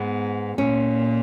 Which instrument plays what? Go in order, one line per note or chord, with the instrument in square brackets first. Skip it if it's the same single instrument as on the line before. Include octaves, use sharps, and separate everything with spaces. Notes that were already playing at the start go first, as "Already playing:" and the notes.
Already playing: [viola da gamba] G#2 [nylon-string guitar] B3
[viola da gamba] A#2 [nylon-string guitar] C#4